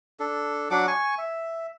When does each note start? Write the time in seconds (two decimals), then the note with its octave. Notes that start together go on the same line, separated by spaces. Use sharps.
0.20 D4 A4
0.71 F#3 D4 F#5 D6
0.88 G#5 C#6
1.18 E5